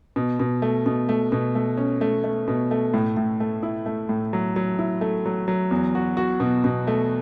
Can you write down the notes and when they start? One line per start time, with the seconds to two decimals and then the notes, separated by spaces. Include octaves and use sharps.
0.16 B2
0.40 B2
0.62 A3
0.86 B2
1.09 A3
1.32 B2
1.55 A3
1.77 C#4
2.01 A3
2.24 A3
2.48 B2
2.71 A3
2.94 A2
3.17 A2
3.40 A3
3.63 E4
3.86 A3
4.09 A2
4.33 F#3
4.56 F#3
4.79 E4
5.01 A3
5.26 F#3
5.48 F#3
5.71 E2
5.95 F#4
6.17 F#4
6.40 B2
6.64 B2
6.87 A3